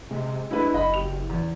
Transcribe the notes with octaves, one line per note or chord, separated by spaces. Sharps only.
C3 G#3
G#3 D4 E4 B4
F#1 D#5 B5
G4 F7
E2